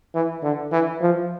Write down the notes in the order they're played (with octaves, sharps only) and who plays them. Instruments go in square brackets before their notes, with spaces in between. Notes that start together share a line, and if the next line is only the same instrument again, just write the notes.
[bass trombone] E3
D3
E3
F3